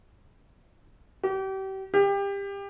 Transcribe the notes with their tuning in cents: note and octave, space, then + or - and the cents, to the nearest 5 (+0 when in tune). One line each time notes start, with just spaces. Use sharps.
G4 -35
G4 +25